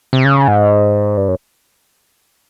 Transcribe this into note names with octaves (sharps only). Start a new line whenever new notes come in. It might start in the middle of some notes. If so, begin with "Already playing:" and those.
C3
C#3
G#2
G2
F#2